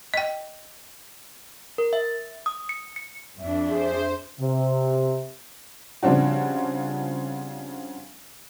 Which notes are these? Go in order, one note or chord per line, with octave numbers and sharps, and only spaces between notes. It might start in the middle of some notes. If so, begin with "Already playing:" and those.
D#5 G5
A#4
E5
D#6
C#7
C#7
F2 D4 E5
G#4 C5
C3
C#3 F3 G3 C4 D4 F#4